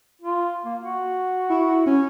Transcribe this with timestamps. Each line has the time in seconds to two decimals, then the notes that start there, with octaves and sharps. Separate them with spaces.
0.22 F4
0.65 A#3
0.82 F#4
1.50 E4
1.86 C#4